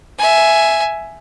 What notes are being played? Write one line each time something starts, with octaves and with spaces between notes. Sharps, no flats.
E5 G#5